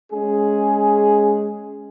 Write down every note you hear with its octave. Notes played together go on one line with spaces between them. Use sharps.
G#3 C#4 G#4